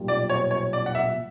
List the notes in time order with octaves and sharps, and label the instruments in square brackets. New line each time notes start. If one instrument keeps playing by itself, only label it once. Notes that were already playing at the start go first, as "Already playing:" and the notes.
Already playing: [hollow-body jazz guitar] B1 A#2 G3
[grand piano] D5
C#5
C#5
D5
F#5
E5